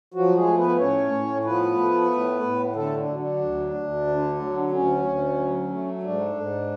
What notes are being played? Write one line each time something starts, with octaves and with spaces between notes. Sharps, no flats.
F3 F#3 F#4
G#3 G#4
A3
B3 B4
A2 C#4 C#5
A2
F3 B3 B4
A3
A2
A2
D3 A3 A4
D4
F#3
D4
D2
D2
D3
F#3
D2 C#4
D2
F#3
A3
G#2 D4
G#2